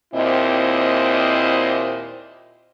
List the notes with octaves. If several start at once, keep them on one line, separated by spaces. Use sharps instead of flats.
D#2 A#2 C4 E4 C5 D#5